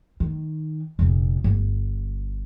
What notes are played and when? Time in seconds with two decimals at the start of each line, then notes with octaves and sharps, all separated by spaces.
0.20 D#3
0.99 F1 A#2
1.44 G1